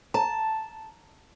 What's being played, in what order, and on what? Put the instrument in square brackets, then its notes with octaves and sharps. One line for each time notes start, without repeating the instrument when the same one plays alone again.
[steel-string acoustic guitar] A5 [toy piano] A#5